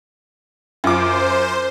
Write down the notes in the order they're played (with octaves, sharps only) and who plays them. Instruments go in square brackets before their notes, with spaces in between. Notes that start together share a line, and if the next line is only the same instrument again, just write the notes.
[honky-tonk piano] F#2 F4 D6 [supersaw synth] C5